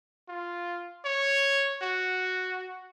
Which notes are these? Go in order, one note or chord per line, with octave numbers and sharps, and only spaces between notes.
F4
C#5
F#4